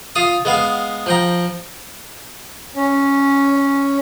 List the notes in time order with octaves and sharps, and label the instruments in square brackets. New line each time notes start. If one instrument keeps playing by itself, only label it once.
[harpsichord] F4 F5 D#6
G#3 B3 F5
F3 G5 A#5
[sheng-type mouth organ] C#4